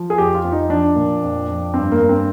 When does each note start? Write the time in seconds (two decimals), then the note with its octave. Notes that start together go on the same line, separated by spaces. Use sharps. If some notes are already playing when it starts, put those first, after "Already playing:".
Already playing: F3
0.10 G#4
0.18 F2 G4
0.35 F4
0.44 F2
0.52 D#4
0.69 F3 D4
0.95 A#2
1.23 F2
1.48 F2
1.74 G2 C4
1.92 A#3
2.00 G2
2.09 C4